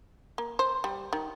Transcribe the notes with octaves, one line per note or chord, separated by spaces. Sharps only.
A#3
C5
G3
D#3